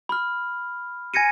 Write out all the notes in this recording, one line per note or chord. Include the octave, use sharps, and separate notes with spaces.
B5 F6
G#5 G#6 A#6 C#7 D#7